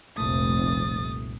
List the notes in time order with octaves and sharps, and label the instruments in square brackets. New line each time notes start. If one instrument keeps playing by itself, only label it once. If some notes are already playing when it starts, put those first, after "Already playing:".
[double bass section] F1 [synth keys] C2 A#2 A3 [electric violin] D#6 A6